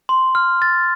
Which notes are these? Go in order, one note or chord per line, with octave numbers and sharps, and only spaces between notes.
C6
F6
A6